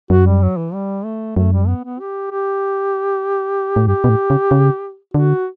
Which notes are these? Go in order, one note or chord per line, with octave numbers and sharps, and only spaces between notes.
F#2 F#4
G3
F#3
E3
G3
A3
F#2 A3
G3
B3
B3
G4
G4
A2
G2 G4
B2
A2
C#3
C#3
D3 F#4